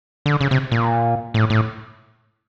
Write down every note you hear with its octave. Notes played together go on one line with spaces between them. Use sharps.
D3
C#3
C3
A#2
A2
A2